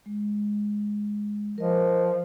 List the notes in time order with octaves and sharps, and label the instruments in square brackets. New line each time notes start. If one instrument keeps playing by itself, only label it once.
[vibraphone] G#3
[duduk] F3 [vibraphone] A#4 D#5